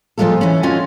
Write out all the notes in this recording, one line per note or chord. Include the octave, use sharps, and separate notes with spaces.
A#2 F3 F#3 G#3 F4 A4
E3 C#4
C#4 F4 F#4 D#5 G#5